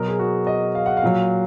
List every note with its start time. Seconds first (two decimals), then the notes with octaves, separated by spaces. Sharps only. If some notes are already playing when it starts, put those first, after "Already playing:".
Already playing: B2 F#3 A#4
0.08 G#4
0.19 F#4
0.47 D#5
0.75 F5
0.86 F#5
0.97 F5
1.03 A#2 F#3